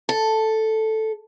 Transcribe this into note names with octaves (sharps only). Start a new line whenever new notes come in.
A4